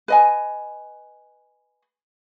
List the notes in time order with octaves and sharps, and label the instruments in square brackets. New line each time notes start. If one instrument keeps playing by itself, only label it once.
[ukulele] B4 D#5 G#5